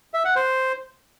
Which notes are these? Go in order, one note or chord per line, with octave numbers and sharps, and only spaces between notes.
E5
F#5
C5